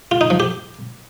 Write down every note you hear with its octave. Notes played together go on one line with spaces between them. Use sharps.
F4
D#4
F3
G4